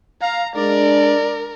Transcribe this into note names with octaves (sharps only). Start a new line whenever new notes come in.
F5 A#5
G#3 D4 A#4 D5